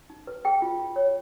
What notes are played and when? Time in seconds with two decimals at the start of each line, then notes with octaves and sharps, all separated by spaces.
0.10 D#4
0.27 B4
0.45 G#4 G5
0.62 F4
0.80 F4
0.96 C#5